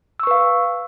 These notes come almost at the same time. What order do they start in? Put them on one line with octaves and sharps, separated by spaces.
E6 C#6 B4 F5